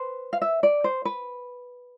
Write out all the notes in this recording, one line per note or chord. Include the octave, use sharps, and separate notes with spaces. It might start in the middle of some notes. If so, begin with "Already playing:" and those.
Already playing: B4 C5
F5
E5
D5
C5
B4